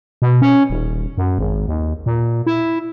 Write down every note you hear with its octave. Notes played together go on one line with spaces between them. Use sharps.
B2
C#4
D#1
F#2
G#1
D#2
A#2
E4